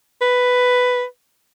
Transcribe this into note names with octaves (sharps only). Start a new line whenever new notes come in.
B4